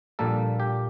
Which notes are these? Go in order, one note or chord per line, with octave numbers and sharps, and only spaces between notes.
A#1 A#2 G3 A#3 A4
G4